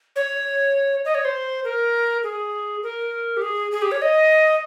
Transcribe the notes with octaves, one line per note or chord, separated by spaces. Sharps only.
C#5
D#5
C#5
C5
A#4
G#4
A#4
G4
G#4
G#4
G4
C#5
D#5